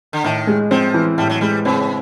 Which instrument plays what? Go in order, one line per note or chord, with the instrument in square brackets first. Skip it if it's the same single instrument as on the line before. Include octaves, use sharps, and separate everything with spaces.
[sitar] D3
[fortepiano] A2 [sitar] D#3
[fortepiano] G#3
[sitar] F3 [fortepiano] C4
[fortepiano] E3
[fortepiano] A2 [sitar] G3
[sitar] F#3
[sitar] G3 [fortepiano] G#3
[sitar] C#3 [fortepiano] C4